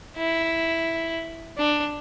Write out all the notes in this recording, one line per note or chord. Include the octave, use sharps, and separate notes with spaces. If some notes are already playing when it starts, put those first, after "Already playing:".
E4
D4